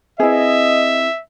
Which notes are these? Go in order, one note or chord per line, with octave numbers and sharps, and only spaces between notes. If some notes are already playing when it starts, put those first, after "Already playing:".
C4 E4 G#4 B4 D#5 E5